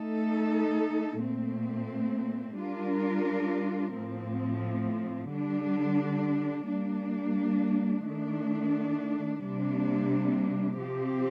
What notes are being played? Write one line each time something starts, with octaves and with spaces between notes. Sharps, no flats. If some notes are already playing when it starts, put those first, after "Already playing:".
Already playing: A3 D#4 A4
A#2 A3 C4
G3 D4 F4 A#4
A2 F3 C4
D3 G3 D4
G3 A#3 D4
D#3 A3 D4
C3 G3 A#3 D4
C3 F3 C4 G4